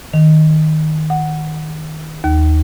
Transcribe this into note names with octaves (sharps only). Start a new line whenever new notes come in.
D#3
F#5
D#2